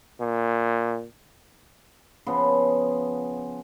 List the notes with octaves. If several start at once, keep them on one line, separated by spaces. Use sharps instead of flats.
A#2
C#3 F3 B3